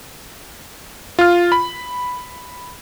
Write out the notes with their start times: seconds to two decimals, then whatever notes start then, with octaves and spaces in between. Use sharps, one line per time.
1.19 F4 F6
1.52 B5